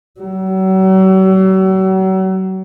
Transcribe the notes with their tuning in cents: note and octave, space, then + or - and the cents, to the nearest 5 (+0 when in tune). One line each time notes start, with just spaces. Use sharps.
F#3 +40